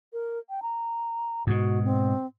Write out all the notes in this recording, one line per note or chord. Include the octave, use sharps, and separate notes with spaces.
A#4
G5
A#5
G#2 B2 F#4
C4